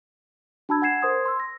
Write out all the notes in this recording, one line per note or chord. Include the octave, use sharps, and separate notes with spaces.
D4 F#4 A5 B5 E6 G#6
F#5 G#5 G#6 C7 E7
A#4 C5 C6 D#6 G#6
C6 E6
A#6